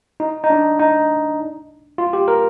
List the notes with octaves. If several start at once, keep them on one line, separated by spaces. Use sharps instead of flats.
D#4
D#4
D4
D#4
F4
G4
A#4